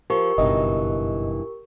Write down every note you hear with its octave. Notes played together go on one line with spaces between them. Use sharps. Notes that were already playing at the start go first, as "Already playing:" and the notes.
F3 G4 A#4 C#6
F#1 G2 B2 E3 D#4 D#5